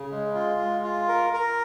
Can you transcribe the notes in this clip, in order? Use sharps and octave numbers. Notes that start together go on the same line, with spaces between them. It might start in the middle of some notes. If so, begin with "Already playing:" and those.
Already playing: C#3
G#3
F4
G#3
F4
A#4
A#4